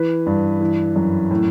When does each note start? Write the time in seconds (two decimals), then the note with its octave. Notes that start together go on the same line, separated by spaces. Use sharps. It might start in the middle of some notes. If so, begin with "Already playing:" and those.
Already playing: E3 B4
0.26 G2
0.61 E3
0.96 F#2
1.31 A2